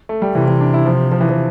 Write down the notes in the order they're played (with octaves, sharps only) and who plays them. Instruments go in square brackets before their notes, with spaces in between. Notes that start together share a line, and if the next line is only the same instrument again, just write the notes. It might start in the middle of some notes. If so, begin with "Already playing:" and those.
[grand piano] A3
G3
[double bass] C3 [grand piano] E3
[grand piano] E3
D4
E4
F3
F3
E3
F3